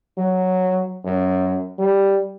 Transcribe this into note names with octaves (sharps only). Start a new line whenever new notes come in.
F#3
F#2
G3